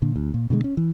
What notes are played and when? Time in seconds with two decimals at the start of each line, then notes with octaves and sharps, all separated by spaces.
0.02 A#2 D3
0.16 D2
0.34 A#2
0.50 B2 D3 F3 G#3
0.64 C#4
0.77 E3